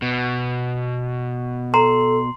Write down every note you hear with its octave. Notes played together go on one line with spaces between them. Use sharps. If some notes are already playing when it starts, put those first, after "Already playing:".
B2
A4 A#5 C6